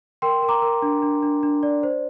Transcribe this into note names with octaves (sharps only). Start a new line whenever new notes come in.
A#4 G5 C6
A#4
A#5 D6
A#4
D4
D4
D4
D4
D5
C5